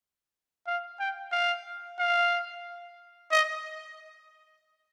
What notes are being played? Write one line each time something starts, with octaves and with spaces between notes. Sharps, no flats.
F5
G5
F5
F5
D#5